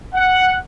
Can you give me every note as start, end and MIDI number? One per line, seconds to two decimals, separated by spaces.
0.14 0.56 78